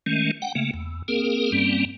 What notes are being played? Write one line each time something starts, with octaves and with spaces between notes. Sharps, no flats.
D#3 G#3 A3 C#4
F#5 G5
C#3 A3 A#3
E2
A#3 C4 G#4 A#4
G2 G3 A#3 C4 C#4